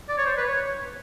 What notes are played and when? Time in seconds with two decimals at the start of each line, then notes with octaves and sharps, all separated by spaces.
0.09 D5
0.18 C#5
0.25 C5
0.37 B4
0.47 C#5